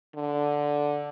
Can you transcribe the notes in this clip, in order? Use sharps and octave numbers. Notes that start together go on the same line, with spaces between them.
D3